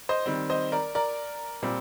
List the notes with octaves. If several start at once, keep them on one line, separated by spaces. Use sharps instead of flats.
C5 D#5
D#3 G3 C4
C5 D#5
A#4 D5
A#4 D5
A#2 G3 C4